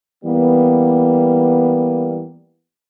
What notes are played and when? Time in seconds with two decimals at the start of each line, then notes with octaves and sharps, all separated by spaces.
0.24 E3 G3 A#3 B3